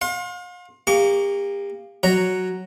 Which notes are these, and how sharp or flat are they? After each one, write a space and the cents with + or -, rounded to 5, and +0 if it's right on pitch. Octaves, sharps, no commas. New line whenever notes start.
F5 +40 C6 +30
A#3 -5 G4 +35 C#6 +40
F#3 +0 C#5 +0 A#5 +0